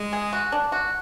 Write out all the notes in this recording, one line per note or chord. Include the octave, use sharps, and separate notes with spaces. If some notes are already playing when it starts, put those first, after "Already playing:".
Already playing: G#3
G#4
F#4
D4
F#4